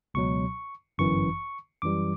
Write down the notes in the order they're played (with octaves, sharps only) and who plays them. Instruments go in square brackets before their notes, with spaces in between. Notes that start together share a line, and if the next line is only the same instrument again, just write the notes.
[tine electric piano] C#2 B2 F#3 C#6
G1 F#2 E3 C#6
F#2 E3 G3 D6